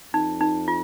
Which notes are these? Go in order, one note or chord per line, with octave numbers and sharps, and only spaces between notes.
F2 D#4
D#4
F4